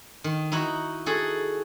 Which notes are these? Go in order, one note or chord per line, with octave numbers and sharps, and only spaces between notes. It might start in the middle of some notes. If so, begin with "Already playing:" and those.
D#3
D#4 E4 F#4
F#4 G#4 A4